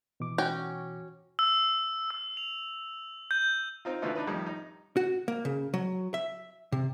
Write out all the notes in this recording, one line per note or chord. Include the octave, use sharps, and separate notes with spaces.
B2 E3 D6
C#4 F#4 G5
E6
E6
F7
G6
C4 D#4 F4
B2 D3 E3 A3 D#4 F4
D4 D#4 B4
F2 A2 D#3 G3
D#4
F#4
A#3
C#3
F#3
E5
C3